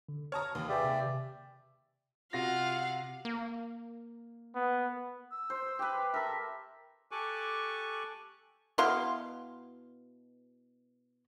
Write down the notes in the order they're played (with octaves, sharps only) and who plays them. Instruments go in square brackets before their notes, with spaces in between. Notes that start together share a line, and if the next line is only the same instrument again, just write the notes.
[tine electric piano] D3
[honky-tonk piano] C#5 A5 A#5 [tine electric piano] D#6 F6
[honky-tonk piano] D#2
[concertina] G4 D5 E5 [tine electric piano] G#4 B4 G#5
[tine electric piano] C3
[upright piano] C3 F#4 A#6 [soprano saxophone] F4 [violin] F5 F#5
[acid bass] A#3
[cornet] B3
[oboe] E6
[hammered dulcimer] C5
G4 B4
[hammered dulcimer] A4 A#4 [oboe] E5
[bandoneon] G4 A4 G#5 C#6 D6 F#6
[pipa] B2 E4 F5 C6